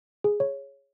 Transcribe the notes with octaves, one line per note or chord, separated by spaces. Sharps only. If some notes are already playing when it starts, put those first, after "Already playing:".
G#4
C#5